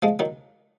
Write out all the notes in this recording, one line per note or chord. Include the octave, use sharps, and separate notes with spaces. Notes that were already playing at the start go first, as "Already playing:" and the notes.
F3 G#3
D#3 F#3